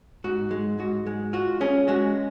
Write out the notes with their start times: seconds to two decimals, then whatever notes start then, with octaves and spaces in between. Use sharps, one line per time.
0.24 G#2 F#4
0.51 G#3
0.79 G#2 F#4
1.07 G#3
1.33 F4 F#4
1.61 C#4 G#4
1.88 G#3 F#4